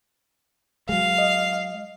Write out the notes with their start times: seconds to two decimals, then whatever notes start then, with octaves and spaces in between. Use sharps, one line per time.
0.89 F#3 G#3 F5
1.18 D#5